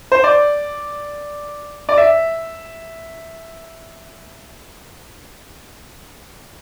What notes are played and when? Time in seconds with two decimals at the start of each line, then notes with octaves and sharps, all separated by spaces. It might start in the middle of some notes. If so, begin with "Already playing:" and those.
0.12 C5
0.24 D5
1.89 D5
1.98 E5